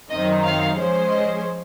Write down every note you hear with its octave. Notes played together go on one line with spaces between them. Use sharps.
F#2 D#3 F#3 C4 D#4 D#5
F5
F3 G#3 C#4 G#4 C5
D#5